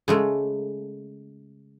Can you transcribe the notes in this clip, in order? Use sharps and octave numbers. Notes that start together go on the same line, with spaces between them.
C#3 G#3 A3